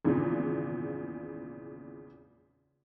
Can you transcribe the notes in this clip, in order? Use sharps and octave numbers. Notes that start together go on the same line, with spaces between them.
G#1 E2 A#2 C#3